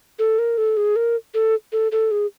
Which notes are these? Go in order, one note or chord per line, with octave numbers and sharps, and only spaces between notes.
A4
A#4
A4
G#4
A#4
A4
A4
A4
G#4